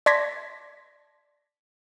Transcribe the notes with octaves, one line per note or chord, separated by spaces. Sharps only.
D5 A5 C6 G#6 A#6 B6